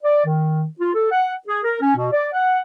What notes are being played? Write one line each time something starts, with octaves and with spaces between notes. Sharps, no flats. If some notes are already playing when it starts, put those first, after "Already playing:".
D5
D#3
F4
A4
F#5
G#4
A#4
C#4
B2
D5
F#5